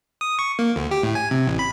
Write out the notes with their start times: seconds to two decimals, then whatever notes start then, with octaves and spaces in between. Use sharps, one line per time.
0.21 D#6
0.39 C#6
0.59 A#3
0.76 D2
0.91 G4
1.03 A2
1.15 G#5
1.31 C3
1.47 A1
1.59 B5